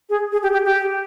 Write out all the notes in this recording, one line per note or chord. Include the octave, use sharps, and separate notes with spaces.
G#4
G#4
G4
G4
G4